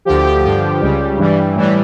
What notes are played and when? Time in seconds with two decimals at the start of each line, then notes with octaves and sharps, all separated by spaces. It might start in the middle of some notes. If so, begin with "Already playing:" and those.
0.05 D2 D3 F3 G4
0.24 G4
0.43 G2 D3 F3 G4
0.81 C#2 C#3 G3
1.17 G2 E3 G3
1.55 A2 E3 G3